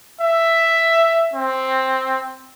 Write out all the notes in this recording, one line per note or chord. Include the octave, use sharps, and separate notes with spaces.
E5
C4